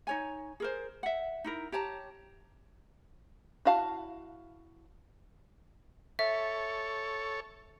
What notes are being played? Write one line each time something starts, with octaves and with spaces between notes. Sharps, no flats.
D#4 C#5 G#5
G#4 A#4 C5
E5 F#5
D#4 E4 A#4
G4 C#5 A5 A#5
E4 F#4 F5 A5
A4 C#5 E5